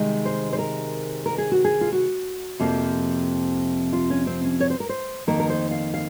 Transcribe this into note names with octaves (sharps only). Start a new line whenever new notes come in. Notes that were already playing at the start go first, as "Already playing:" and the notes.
Already playing: C3 D#3 G#3
C5
C5
A#4
A#4
G#4
F#4
G#4
F4
F#4
F2 C3 F3 A#3
F4
C#4
C4
C#4
C#5
C5
A#4
C5
F2 D#3 A#3 A#4
A#4
C5
F5
F5